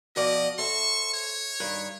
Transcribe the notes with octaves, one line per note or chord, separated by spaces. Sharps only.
B2 F3 D5 D#5
A4 C5 E5 C#6
C#5
G2 D#3